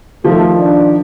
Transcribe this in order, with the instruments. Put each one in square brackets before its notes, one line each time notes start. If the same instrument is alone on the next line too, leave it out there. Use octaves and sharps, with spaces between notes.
[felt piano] D#3 F3 [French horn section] A3 A4
[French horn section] D4